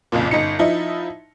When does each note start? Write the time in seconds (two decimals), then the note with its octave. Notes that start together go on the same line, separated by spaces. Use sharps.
0.12 F#1 B1 F2 A#2
0.31 G1 D#4 C#7
0.59 F3 D#4 E4